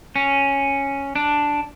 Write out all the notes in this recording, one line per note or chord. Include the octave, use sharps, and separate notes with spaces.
C#4
D4